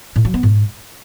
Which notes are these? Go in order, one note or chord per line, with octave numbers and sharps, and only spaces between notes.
A2
F#3
B3
G#2